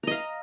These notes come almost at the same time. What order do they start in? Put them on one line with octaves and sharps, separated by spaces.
A#5 D#5 F5